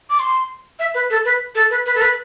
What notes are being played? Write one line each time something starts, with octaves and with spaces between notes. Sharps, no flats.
D6
C6
E5
B4
A4
B4
A4
B4
B4
A4
B4